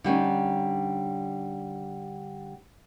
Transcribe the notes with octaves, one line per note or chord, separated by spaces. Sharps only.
D3 G3 C#4 D#4